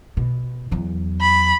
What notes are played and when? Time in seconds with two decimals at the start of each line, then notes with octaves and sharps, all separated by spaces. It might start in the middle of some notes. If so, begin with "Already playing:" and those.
0.17 B2
0.71 E2 F#3
1.21 B5